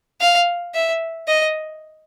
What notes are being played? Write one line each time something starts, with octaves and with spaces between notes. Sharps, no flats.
F5
E5
D#5